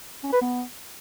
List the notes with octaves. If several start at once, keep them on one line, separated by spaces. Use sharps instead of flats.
C#4
B4
B3